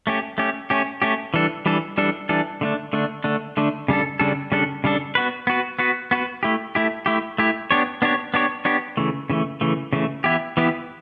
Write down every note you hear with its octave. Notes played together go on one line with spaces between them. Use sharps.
A3 C#4 G4
A3 C#4 G4
A3 C#4 G4
A3 C#4 G4
E3 G3 D4 A4
E3 G3 D4 A4
E3 G3 D4 A4
E3 G3 D4 A4
D3 A3 D4
D3 A3 D4
D3 A3 D4
D3 A3 D4
C#3 G3 D4 A4
C#3 G3 D4 A4
C#3 G3 D4 A4
C#3 G3 D4 A4
B3 F#4 B4
B3 F#4 B4
B3 F#4 B4
B3 F#4 B4
A3 E4 G4
A3 E4 G4
A3 E4 G4
A3 E4 G4
B3 D4 G4 C#5
B3 D4 G4 C#5
B3 D4 G4 C#5
B3 D4 G4 C#5
C#3 E3 A3
C#3 E3 A3
C#3 E3 A3
C#3 E3 A3
E3 B3 E4 G4
E3 B3 E4 G4